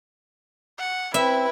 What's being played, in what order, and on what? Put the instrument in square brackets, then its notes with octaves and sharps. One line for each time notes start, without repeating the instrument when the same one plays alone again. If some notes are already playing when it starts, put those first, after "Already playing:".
[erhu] F#5
[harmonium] C4 [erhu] E4 [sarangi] B4 [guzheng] E5